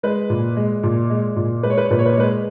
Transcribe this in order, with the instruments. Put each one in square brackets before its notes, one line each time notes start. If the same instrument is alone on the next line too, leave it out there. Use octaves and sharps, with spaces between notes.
[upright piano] G#3 B4
A#2
G#3
A#2
G#3
A#2
G#3 B4
C#5
B4
C#5
A#2 B4
C#5
B4
C#5
G#3 B4